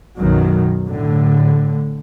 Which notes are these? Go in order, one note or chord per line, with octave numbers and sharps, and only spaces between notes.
B1 F#2 B2 D#3 F#3
A2 D3